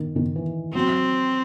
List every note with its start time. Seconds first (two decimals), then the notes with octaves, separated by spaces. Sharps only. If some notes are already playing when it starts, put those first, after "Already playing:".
Already playing: D#3
0.16 D#3
0.36 E3
0.74 F#3 C4